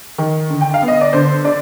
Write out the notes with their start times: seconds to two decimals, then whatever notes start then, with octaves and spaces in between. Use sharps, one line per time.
0.18 D#3
0.50 D3
0.61 G5
0.74 F5
0.82 B3
0.88 D#5
1.01 D5
1.13 D3 C5
1.44 D4 D5